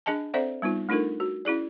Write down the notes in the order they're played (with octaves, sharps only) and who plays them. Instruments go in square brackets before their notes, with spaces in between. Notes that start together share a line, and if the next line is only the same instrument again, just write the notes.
[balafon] D4 G#4 D#5 G#5 A5
C4 A4 C5 D5 E5 F#5
G3 B3 D#4 F4
A3 D4 D#4 F4 A4 A#4
F#4
C#4 E4 G#4 D5